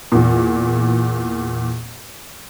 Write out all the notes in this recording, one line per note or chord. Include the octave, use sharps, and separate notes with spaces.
E2 A#2